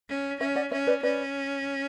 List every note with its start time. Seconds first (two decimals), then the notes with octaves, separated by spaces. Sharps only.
0.09 C#4
0.40 C#4 C#5 E5
0.56 D5 F#5
0.71 C#4 C#5 E5
0.87 B4 D5
1.03 C#4 B4 D5